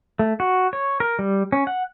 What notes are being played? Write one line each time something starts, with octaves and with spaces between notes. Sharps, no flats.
A3
F#4
C#5
A#4
G3
C#4
F#5